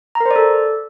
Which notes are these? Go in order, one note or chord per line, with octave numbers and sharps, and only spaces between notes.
A#5
A#4
C5
D5
A4